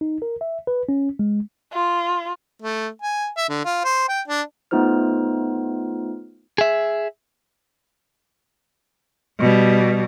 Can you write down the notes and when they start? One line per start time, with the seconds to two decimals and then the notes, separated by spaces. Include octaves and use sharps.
0.01 D#4
0.22 A#4
0.41 E5
0.67 B4
0.89 C#4
1.19 G#3
1.73 F4
2.62 A3
3.02 G#5
3.37 E5
3.49 D3
3.65 F4
3.84 C5
4.09 G5
4.28 D4
4.71 A3 B3 D#4 F4 C5 F6
6.58 G#4 E5
9.40 B2 G3